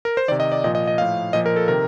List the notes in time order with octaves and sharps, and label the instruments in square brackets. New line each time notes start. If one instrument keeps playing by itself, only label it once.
[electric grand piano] A#4
C5
C3 D#3 D5
D#5
D5
A#2 F3 D#5
D#5
D#5
A2 F3 F5
A#2 F3 D#5
A#4
A4
C3 D#3 A#4